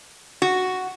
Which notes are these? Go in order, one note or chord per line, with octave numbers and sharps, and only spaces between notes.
F#4